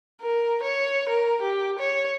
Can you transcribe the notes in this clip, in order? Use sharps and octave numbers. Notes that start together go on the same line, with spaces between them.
A#4
C#5
A#4
G4
C#5